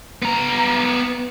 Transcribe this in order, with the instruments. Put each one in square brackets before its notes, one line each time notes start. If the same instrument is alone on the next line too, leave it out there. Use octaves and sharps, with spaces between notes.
[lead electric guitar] B3 A#5